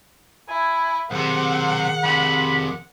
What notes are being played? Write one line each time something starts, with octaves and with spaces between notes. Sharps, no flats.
E4 G#5
B1 C3 D#3 G#4 C5 F#5
F2 C3 B5